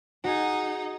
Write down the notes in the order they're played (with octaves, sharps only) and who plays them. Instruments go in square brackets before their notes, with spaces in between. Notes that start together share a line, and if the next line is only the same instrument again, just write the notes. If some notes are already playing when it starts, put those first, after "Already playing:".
[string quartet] D#4 [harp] F#4 G#4